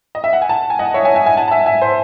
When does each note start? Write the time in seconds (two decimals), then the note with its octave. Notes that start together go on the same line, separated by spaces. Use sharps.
0.15 D#5
0.24 E5
0.33 F#5
0.42 G#5
0.49 F#5 A5
0.70 G#5
0.79 D#5 F#5
0.94 C#5 E5
1.05 E5 G#5
1.15 E5 G#5
1.26 E5 G#5
1.37 F#5 A5
1.48 A5
1.51 E5 G#5
1.66 E5 G#5
1.82 C5